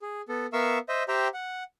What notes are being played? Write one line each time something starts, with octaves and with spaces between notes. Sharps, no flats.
G#4
B3 A4
B3 A#4 E5 F5 C#6 E6
C5 D#5 E5
G4 C5 E5 G5 A#5
F#5